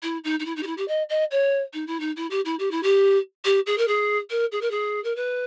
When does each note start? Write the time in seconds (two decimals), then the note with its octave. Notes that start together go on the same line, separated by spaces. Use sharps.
0.03 E4
0.24 D#4
0.39 D#4
0.45 E4
0.56 D#4
0.63 G4
0.66 E4
0.77 G4
0.88 D#5
1.09 D#5
1.31 C#5
1.73 D#4
1.87 E4
2.00 D#4
2.16 E4
2.30 G4
2.45 E4
2.59 G4
2.71 E4
2.83 G4
3.45 G4
3.66 G#4
3.78 A#4
3.87 G#4
4.30 A#4
4.52 G#4
4.61 A#4
4.71 G#4
5.04 A#4
5.16 B4